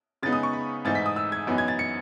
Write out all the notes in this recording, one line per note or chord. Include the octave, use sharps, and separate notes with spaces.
C#3 G#3 B3 D#4 A6
D#6
C#6
B5
G#2 E3 A3 D#4 A6
B6
D#6
E6
G#6
F#2 E3 B3 D#4
G#6
A6
C#7